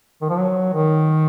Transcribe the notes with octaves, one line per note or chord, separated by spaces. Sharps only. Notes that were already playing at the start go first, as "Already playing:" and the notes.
D#3
F3
F#3
D#3